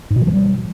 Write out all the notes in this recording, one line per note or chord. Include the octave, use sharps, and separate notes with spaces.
G#2
B2
F3
F#3
G3